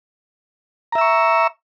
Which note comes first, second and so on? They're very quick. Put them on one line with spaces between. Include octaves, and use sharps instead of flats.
A#5 E5 E6 C#6